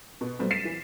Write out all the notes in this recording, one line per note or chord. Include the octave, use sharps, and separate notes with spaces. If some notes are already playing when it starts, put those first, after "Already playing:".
B2
B2 F#3 G3 A3 C4
A6 B6 C7 D#7 E7
E3